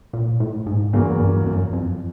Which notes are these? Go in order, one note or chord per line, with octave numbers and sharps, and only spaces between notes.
A#2
A2
G#2
E2 G2 C#3 F#3 A#3
G2
F#2
F2